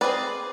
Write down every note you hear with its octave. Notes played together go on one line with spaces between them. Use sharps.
C4 G#4 B4 D5